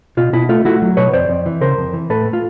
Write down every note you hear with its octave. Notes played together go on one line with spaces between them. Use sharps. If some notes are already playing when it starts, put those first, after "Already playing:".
B2 F4
B2 E4
A3 F4
A3 E4 F#4
F#3
B2 B4 C#5
F2 C5 D5
F2
E3
C#3 A#4 C5
F2
E3
A2 A4 B4
A3
F4